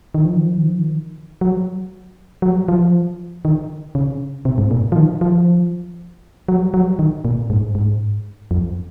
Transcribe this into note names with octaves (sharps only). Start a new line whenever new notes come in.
D#3
F3
D#3
F3
D#3
F3
D#3
F#3
F#3
F3
D#3
C#3
C3
G#2
A#2
F3
D#3
F3
F#3
F#3
D#3
A#2
G#2
G#2
F2